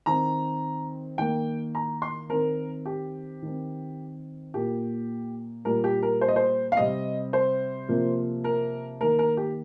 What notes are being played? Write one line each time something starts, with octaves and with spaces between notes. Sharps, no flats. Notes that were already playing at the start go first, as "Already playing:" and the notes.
D#3 C4 A#5
D#3 A#3 G5
A#5
C6
D#3 C4 A#4
G4
D#3 C4
A#2 A#3 G4
A#2 G3 A#3 A#4
G4
A#4
C5
D#5
C5
F5
C3 G3 C4 D#5
C5
C3 F3 A#3
A#4
D#3 A#3 A#4
A#4
G4